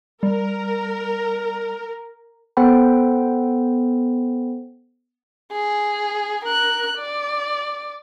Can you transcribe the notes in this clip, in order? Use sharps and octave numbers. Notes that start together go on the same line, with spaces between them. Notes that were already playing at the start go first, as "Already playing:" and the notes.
G3 A#4
B3 A4 C5 F#5 G5 B5
G#4
A#4 F#6
D5